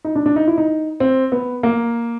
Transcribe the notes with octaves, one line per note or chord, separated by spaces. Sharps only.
D#4
D4
D4
D#4
E4
D#4
C4
B3
A#3